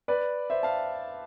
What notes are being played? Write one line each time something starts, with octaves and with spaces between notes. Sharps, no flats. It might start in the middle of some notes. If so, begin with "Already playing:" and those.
B4 D5
C5 E5
F5 A5